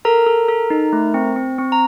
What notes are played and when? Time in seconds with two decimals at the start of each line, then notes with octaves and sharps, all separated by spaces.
0.05 A4 A#4 A#5
0.26 A4
0.49 A4
0.70 D#4
0.93 A3
1.14 C4
1.36 C4
1.58 C4
1.72 A#5